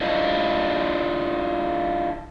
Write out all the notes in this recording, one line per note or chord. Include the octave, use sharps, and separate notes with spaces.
D4 E4 F4 D#5